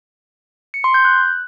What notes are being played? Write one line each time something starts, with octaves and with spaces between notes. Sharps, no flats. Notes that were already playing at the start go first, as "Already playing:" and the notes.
C#7
C6
G6
F#6